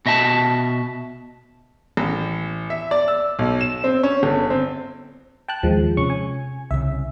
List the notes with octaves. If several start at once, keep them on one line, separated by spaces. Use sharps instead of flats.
B2 D#5 E5 A5
A1
E5
D5
E6
B1
E7
C4
C#4
G1
C4
G5 A5 F#6
D#2 F3 G#3
C3 C#4 C#6
G#5
C2 C#3 E5